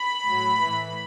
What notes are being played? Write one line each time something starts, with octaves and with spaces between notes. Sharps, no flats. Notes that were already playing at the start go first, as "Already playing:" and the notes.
Already playing: B5
A2 F#3
A2 E3